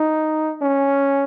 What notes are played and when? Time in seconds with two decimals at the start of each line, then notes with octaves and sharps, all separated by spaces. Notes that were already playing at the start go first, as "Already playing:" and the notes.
Already playing: D#4
0.62 C#4